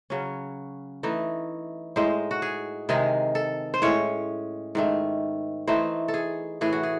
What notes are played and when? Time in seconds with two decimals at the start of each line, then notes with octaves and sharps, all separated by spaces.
0.10 C#3 F#3 C#4
1.03 E3 A3 D#4
1.96 A2 G#3 D#4 C5
2.31 F#4
2.42 G#4
2.89 C3 D#3 G#3 D#4 G#4
3.35 A4
3.74 C5
3.82 A2 G#3 C#4 C#5
4.75 G#2 D#3 A3
5.68 E3 A3 D#4 C5
6.08 A4
6.14 G#4
6.61 A2 E3 A3 G#4
6.73 F#4
6.83 G#4